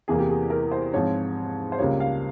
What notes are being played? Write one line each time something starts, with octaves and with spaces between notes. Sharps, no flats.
E2 C3 E3 A#3 G#4
G4
G#4
A#4
C5
G#2 F3 C4 C#5
C5
C#2 C#3 G3 A#3 C#5
F5